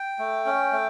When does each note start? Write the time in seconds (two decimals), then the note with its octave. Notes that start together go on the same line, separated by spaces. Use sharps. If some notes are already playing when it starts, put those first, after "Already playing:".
Already playing: G5
0.19 A3
0.46 C#4
0.72 A3